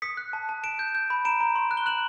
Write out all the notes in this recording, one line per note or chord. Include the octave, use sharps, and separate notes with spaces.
D#6 B6 C#7
F#6
A5
A5
A5 D7 E7
G6
G6
B5
A#5 D7 E7
A#5
C6
F#6
G7
F#6 E7 F#7